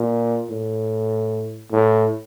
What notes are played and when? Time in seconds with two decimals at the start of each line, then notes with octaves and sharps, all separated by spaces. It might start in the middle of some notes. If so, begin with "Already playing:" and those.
Already playing: A#2
0.50 A2
1.71 A2